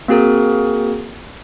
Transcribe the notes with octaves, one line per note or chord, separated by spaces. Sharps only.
A#3 C4 F#4 G#4 A#4